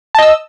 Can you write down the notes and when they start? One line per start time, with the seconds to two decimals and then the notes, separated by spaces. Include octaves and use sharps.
0.15 A5
0.19 D#5
0.22 E6